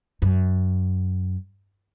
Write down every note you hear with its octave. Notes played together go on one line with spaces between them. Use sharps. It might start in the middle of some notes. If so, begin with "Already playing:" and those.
F#2